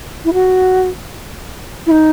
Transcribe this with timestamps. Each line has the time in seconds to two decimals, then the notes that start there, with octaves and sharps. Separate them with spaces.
0.25 E4
0.33 F#4
1.86 E4
1.91 D#4